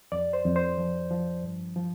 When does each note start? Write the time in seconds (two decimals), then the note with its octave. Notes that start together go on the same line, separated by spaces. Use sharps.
0.12 F2 D5
0.33 C5
0.45 F2
0.56 C5
0.78 F3
1.10 F3
1.44 G2
1.76 F3